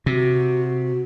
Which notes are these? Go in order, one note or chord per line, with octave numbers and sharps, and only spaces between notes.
C3 F#4